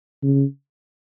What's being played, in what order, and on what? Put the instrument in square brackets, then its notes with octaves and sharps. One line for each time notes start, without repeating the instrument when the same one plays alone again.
[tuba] C#3